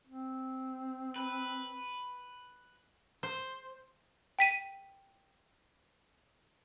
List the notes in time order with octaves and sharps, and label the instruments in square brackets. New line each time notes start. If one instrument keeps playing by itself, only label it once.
[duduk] C4
[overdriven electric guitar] B4
[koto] C5
[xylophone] G5 B6 D#7